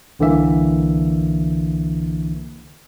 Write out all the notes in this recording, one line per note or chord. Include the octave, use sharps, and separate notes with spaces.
C2 D3 E3 A#3 E5